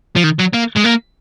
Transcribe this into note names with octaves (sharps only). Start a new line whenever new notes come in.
F3
D#3
F#3
A#3
G#3
A#3